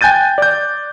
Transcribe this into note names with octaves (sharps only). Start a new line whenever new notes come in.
G5 G#5 F#6 G6 A6 D#7
D5 G6